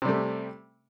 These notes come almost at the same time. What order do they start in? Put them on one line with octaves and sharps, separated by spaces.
C3 G3 A3